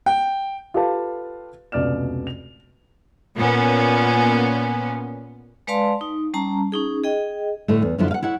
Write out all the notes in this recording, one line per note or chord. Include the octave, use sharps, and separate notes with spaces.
G5
F4 G4 A4 B4 F5 A5
F1 C#2 B2 D5 F6 E7
F7
A#2 B3 C#4
G#3 B4 D5 F5 A5 C6
D#4
G3 C#4 A5 A#5
C#4 D#4 G#4
G#4 D#5 G5
A2 D3 A3
E2
F#2 D3 F3 D4 E4 F4
F5 F#5
E4 C#5 F#5